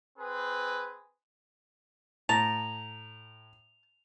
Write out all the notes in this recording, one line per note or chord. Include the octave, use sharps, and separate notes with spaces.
C4 G#4 B4
A2 A5 A#5 A#6 F7